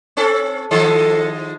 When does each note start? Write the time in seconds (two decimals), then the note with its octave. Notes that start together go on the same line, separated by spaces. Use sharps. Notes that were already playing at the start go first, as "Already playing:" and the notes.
0.17 C4 C#4 A4
0.71 D#3 F3 G#3 A4